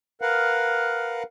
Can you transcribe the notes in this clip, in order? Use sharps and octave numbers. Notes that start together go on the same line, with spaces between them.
A#4 B4 F5 F#5